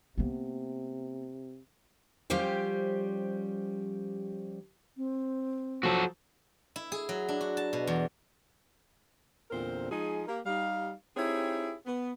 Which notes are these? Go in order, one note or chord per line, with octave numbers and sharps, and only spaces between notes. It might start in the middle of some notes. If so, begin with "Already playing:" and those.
C3 A#3 B3
F3 G3 C#4 G4 C5 G5
C4
F3 F#3 F#4 A4
E4
G#4
F#3
D4
F#4
A5
B2
E2
E2 A#2 D3 C4 A#4 C5
F3 G#3 D#4 G#4
A#3 G4 A#4
G3 D#4 G4 F5
C4 D#4 E4 G4 G#4 C#5
B3